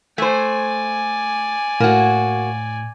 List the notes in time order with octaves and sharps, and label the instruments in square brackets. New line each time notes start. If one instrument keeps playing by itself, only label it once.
[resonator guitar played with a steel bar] A3 C5 [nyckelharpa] D5 G#5
[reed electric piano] A2 [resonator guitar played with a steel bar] A#3 F#4